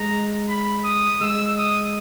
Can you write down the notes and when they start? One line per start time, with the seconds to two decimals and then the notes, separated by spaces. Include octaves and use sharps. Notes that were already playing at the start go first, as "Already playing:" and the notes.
Already playing: G#3 A#5
0.49 B5
0.84 D#6
1.21 G#3 E6
1.57 D#6